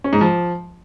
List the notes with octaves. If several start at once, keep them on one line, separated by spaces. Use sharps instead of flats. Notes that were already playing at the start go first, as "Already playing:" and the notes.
C#4
G#2
F3